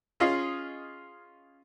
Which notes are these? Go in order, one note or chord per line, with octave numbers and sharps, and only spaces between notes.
C#4 F4 G#4 D#5 F5